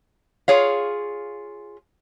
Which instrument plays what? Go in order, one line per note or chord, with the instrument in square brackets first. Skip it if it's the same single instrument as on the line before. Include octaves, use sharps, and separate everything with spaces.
[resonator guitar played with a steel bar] F4 G#4 C#5 F5